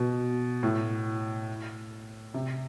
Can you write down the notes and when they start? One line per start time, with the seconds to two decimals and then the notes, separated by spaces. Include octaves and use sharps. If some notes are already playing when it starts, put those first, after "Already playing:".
Already playing: B2
0.63 A2
2.34 C3